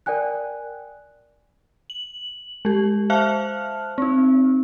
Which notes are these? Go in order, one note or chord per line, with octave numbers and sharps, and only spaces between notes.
A#4 D5 G5 G#5 F#6
F#7
G#3 G4
C5 E5 F5 A5 F6 F#6
C4 D#4